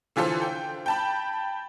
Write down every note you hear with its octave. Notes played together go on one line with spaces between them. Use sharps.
D3 E3 F4 A4 C5
G5
G5 A5 B5